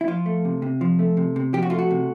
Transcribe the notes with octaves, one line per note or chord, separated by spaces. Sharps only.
E4
F3 F4
A3
C3
C3
F3
A3
C3
C3
F3 G4
F#4
A3 F4
F#4
C3